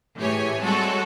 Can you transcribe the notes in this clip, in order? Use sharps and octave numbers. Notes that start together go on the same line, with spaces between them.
A2 E3 G4 G#4 C#5 G#5
G3 G#3 C4 F#4 A4 C#5